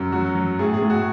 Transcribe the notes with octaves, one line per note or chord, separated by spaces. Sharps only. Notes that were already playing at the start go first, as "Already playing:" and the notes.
Already playing: F#2
F#3 F#4
F#3
A2 G#4
G#4
A2
F#4